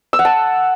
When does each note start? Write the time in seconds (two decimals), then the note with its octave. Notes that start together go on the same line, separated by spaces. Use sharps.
0.13 E6
0.19 F#5
0.25 A5